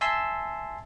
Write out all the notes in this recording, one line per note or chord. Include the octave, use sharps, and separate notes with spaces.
E5 G#5 A5 C6 E6